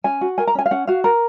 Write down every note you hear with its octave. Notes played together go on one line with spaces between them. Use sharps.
C#4 G#5
F#4
A#4 G#5
A#5
C#4 G#5
F5
C#4 F#5
F#4 F5
A#4